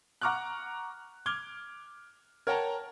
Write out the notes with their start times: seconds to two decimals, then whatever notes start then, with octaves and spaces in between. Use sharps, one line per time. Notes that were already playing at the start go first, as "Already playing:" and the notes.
0.21 F#5 A#5 C#6 D6 F6 F#6
1.26 D6 F6 G#6 G7
2.47 A#4 C#5 F#5 G5 A5 A#5